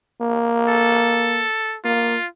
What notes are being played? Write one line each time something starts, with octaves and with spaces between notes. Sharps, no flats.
A#3
A4
A#3 F4